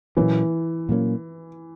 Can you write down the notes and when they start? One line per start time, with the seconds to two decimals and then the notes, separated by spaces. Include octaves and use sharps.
0.17 A#2 E3 F#3 A#3 C#4
0.89 A#2 F#3 A#3 C#4